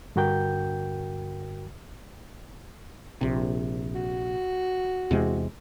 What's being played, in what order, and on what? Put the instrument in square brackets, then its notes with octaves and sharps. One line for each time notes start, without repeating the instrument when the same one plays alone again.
[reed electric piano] G2 D3 F#4 A#4 G5 G6
[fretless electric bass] A#1 C3
[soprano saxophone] F#4
[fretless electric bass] E2 C3 G#3